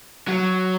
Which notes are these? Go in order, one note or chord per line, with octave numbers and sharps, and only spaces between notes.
F#3